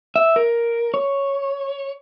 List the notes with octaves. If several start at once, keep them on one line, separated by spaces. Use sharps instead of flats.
E5
A#4
C#5